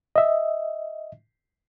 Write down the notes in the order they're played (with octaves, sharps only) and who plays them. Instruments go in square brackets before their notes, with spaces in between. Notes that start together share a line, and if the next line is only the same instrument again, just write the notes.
[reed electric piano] D#5 E5